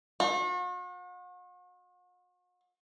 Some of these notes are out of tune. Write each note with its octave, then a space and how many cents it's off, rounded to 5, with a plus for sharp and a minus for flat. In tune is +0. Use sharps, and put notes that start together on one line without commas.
F#4 -45